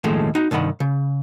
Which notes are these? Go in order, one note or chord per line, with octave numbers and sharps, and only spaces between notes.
D#2 A2 F3 G#3 A3
D#4 F#4
C2 G2 D#3 F#5 B5
C#3